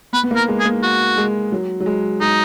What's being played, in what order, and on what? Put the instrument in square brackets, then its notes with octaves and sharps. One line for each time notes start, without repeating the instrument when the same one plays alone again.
[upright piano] B3 [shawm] B4
[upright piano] B3
A#3
[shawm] A#4
[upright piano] G#3
[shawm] G#4
[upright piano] A#3
[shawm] F#4
[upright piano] G#3
F#3
F#3
G#3
[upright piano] G#3 [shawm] D#4